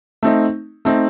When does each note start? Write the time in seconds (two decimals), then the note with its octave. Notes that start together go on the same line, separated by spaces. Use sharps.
0.23 A3 C4 D#4
0.85 A3 C4 D#4